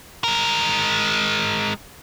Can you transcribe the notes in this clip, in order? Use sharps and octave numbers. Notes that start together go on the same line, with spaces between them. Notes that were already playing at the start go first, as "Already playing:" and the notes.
G#3 A#4